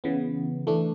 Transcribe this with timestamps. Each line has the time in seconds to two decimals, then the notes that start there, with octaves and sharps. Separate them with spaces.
0.04 C#3 E3 B3
0.67 E3 A3 D4